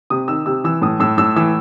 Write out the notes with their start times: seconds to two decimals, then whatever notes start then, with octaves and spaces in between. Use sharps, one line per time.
0.10 C3 D#6
0.28 D#3 E6
0.46 C3 E6
0.64 E3 E6
0.82 A2 D#6
1.00 A2 E6
1.18 A2 E6
1.36 E3 E6